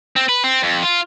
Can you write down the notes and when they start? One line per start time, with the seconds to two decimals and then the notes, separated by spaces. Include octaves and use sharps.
0.16 C4
0.29 B4
0.44 C4
0.63 F2
0.83 F4